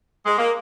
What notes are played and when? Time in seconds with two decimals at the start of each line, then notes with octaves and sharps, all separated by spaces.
0.26 G#3
0.38 A#3